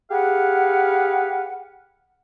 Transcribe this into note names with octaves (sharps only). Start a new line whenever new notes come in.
G4 G#4 B4 F5 F#5